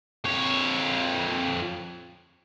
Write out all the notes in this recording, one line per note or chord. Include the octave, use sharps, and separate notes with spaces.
F2 C#5